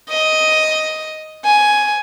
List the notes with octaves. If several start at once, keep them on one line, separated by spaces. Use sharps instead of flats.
D#5
G#5